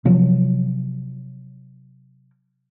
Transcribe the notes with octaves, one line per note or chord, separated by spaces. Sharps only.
C3 F3 F#3